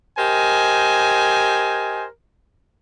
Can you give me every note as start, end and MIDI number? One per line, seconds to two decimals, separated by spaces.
0.18 2.05 67
0.18 2.05 70
0.18 2.05 72
0.18 2.05 75
0.18 2.05 80